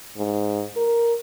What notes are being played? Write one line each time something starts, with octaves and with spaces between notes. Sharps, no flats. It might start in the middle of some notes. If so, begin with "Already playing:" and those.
G#2
A#4